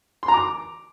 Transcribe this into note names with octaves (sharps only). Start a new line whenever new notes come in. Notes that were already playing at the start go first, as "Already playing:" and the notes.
C6
A#5
D6